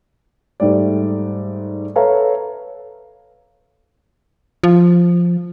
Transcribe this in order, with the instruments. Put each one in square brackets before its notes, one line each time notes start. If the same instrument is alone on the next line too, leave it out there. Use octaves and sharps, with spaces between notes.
[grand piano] G#2 G3 A3 D5
A4 B4 C#5 E5 F5 A#5
[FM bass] F3